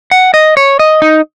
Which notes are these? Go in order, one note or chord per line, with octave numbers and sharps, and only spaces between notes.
F#5
D#5
C#5
D#5
D#4